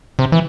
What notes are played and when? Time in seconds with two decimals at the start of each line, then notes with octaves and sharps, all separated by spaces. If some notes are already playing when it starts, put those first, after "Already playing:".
0.19 C3
0.32 E3